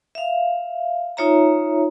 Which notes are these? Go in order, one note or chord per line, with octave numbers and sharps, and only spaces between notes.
E5 F5
D#4 F4 C#5 E5 A#5